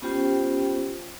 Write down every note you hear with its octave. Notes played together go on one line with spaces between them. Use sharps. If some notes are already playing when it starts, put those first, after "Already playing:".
B3 C#4 F4 G4 C5 G5